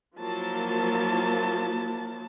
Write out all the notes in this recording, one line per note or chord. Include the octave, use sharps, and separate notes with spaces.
F3 F#3 A#3 E4 A5